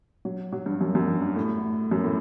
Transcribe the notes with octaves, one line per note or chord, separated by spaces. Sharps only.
F#3
F#3
G2
F#2
F#2
G2
G2
A2
F#2
A2